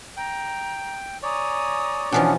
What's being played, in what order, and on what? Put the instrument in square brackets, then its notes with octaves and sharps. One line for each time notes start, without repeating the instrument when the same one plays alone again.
[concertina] G5 [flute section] A#5
[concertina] C#5 D5 [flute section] G#5 A#5 D#6
[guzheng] B2 E3 F3 [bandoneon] B3 C#4 D4